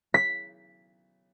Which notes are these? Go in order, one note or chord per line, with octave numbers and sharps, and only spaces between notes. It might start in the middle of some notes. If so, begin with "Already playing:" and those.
B6